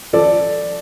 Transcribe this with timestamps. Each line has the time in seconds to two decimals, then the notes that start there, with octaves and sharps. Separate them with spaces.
0.13 F3 A4 D5